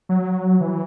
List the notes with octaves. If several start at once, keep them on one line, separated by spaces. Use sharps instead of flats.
F#3
E3